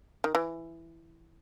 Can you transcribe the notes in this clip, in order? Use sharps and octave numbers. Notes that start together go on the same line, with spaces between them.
D#3
E3